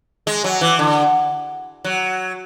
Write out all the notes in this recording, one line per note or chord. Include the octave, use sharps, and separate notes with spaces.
G#3
F#3
E3
D3
F#3